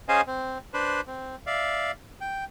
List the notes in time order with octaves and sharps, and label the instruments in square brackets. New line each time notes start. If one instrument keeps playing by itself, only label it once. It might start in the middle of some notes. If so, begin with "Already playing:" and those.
[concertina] C#4 G#4 C5 D#5 F5 G#5
C4
D4 B4 C5
C4
D5 E5 F5
G5